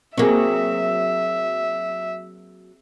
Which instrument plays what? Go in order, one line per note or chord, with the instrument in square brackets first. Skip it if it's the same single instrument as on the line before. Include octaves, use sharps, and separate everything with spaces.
[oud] F#3 A#3 [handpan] C4 G#4 [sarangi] E5